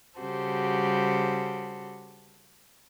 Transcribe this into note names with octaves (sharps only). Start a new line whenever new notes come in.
C#3 G3 F#4 G4 A4 C5